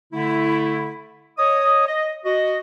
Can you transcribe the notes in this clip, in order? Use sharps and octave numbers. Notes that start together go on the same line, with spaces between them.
D3 A3 E4
C#5 D#5 D#6
D#5
F#4 D#5